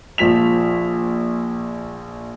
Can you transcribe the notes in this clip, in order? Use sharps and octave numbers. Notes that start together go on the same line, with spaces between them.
A#1 F3 B6 F7